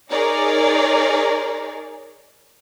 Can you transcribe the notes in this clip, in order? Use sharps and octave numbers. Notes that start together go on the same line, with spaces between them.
D#4 G#4 A#4 C#5 D5